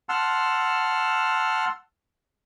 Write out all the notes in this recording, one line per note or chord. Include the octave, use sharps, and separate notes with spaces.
F#5 A5 C6 E6 F6